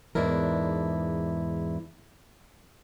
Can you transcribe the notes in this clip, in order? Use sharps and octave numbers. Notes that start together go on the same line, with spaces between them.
E2 G#2 D4 E4 A#4